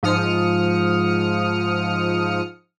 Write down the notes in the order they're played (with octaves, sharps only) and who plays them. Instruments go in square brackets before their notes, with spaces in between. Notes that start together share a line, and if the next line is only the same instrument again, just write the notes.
[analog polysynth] G#2 F3 D#6 F6 C#7